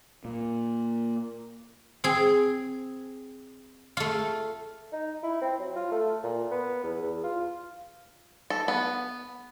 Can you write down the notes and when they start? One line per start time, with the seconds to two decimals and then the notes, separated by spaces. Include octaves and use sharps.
0.25 A#2
2.04 C4 G#4
3.97 A3 F4
4.92 D#4
5.23 E4
5.41 C4
5.60 F#3
5.76 F4
5.92 A3
6.24 A#2
6.51 B3
6.84 E2
7.03 E2
7.24 F4
8.50 A4
8.68 B3